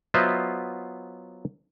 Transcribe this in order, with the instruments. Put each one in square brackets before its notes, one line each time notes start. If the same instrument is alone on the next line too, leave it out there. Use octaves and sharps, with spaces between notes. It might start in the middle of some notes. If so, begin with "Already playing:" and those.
[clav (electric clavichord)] F#3 B3 F4 C5 D#5 E5